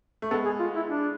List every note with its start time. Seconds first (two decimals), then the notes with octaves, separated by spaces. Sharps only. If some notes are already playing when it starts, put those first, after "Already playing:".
0.22 A3
0.31 G#3 B3 A4
0.46 G#4
0.60 F4
0.76 E4
0.90 D4